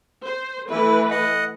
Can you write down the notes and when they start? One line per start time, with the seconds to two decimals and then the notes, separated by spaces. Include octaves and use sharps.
0.25 C5
0.71 E3 A3 E4 B4
1.11 D#5 F#5